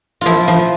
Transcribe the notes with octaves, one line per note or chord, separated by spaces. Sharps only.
F3 E4 F4
F3